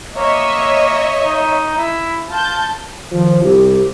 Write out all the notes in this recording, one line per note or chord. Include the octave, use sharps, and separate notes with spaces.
A#3 C#5 D#5 E5
D#4
E4
F4 A5 G6
D#3 F3
C2 G4